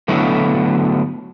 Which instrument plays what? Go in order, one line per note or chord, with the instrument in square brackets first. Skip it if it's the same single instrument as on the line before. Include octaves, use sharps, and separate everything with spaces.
[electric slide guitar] D3 F#3 A3 B3 E4 F#4